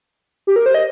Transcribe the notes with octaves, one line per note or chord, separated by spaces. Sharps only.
G4
A#4
C5
D#5